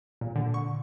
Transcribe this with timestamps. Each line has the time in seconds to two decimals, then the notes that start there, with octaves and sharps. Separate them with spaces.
0.21 A#2
0.36 D3
0.54 C#6